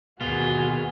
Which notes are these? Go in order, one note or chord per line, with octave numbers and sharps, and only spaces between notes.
D#2 B2 F4 F#4 G#4